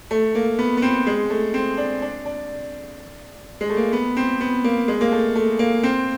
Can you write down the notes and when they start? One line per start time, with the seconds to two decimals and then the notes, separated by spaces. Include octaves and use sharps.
0.11 A3
0.35 A#3
0.59 B3
0.77 B3
0.82 C4
1.07 G#3
1.30 A3
1.54 C4
1.78 D4
2.02 D4
2.26 D4
3.61 G#3
3.70 A3
3.77 A#3
3.92 B3
4.17 C4
4.40 B3
4.64 A#3
4.88 G#3
5.01 A#3
5.12 A3
5.36 A3
5.59 A#3
5.83 C4